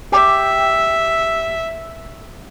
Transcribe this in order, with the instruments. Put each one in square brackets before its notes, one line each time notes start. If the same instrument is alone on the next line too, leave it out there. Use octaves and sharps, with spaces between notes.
[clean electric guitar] G4 [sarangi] E5